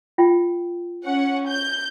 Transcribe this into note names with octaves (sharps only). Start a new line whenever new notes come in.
F4 G5
C#4 F#5
G6